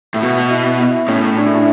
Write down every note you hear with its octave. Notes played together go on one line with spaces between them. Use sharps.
A2 E4
B2 F#4
E4
E4
A2 C#4
D4
E4
D4